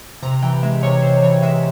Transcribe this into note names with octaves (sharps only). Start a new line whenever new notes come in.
C3 A#5
E3 G5
G#3 E5
C3 C#5
C3 C5
E3 C#5
G#3 E5